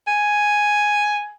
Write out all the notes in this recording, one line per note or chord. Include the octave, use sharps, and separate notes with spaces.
G#5